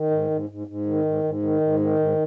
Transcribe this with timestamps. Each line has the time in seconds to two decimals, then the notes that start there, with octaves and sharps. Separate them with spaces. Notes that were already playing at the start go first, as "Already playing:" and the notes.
Already playing: D#3
0.11 G#2
0.30 G#2
0.49 G#2
0.67 G#2
0.86 D#3
1.05 G#2
1.23 G#2
1.43 D#3
1.61 G#2
1.80 D#3
1.99 G#2